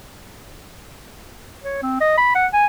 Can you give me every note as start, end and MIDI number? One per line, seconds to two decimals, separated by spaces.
1.64 1.81 73
1.82 2.00 60
2.00 2.16 75
2.18 2.34 83
2.35 2.47 78
2.53 2.67 80